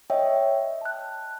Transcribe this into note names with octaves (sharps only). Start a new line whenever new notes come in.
C#5 D#5 E5 G5
A5 F#6